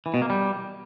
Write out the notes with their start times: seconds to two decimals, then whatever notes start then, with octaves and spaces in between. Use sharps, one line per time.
0.06 E3
0.14 B2
0.22 A#3
0.30 G3